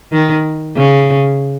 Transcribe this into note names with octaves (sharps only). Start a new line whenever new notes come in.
D#3
C#3